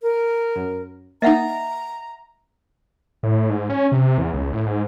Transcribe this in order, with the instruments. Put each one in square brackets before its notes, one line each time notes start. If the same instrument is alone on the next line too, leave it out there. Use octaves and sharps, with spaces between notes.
[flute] A#4
[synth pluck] F#2
[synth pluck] A#3 D#4 [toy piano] D#5 E5 F#5 [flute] A#5
[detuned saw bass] A2
G#2
C#4
C3
E2
C#2
A2
G#2